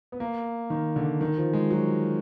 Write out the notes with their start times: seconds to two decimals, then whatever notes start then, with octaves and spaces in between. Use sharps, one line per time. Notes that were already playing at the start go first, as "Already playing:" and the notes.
0.12 B3
0.20 A#3
0.70 D#3
0.96 D3
1.21 D#3
1.38 F3
1.53 G#3
1.70 F#3